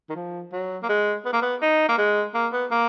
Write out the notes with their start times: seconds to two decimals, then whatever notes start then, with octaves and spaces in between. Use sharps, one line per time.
0.10 D#3
0.15 F3
0.52 F#3
0.82 A#3
0.89 G#3
1.26 B3
1.33 A#3
1.42 B3
1.62 D#4
1.89 A#3
1.98 G#3
2.34 A#3
2.53 B3
2.71 A#3